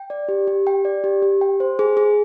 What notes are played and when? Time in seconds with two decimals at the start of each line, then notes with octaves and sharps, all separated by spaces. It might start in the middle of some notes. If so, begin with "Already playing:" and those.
Already playing: G5
0.10 D5
0.29 G4
0.47 G4
0.67 G5
0.85 D5
1.04 G4
1.22 G4
1.41 G5
1.60 C5
1.79 G#4
1.97 G#4